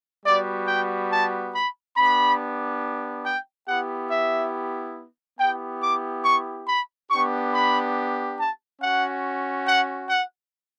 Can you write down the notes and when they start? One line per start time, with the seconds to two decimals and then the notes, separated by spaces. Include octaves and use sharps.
0.25 G3 B3 F#4 D5
0.68 G5
1.12 A5
1.54 B5
1.97 B3 D4 G4 B5
3.26 G5
3.67 B3 E4 G4 F#5
4.10 E5
5.39 B3 E4 G4 G5
5.81 D6
6.24 C#6
6.68 B5
7.10 B3 D4 G4 C#6
7.54 B5
8.38 A5
8.81 C#4 F#4 F#5
9.67 F#5
10.09 F#5